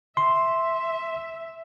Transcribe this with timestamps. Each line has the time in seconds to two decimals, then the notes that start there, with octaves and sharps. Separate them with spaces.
0.17 E5 C6